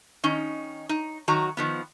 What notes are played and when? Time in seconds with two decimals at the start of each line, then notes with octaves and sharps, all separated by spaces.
0.24 D#3 C#4 D#4
0.89 D#4
1.28 D#3 F#3 F#4 A#5
1.57 D#3 F3 B3